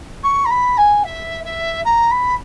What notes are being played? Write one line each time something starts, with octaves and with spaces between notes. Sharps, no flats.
C#6
A#5
B5
G#5
E5
E5
A#5
B5